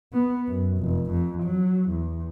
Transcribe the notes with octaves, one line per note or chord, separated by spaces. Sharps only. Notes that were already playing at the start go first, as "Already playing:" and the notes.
B3
F#2
F1
F2
F#3
E2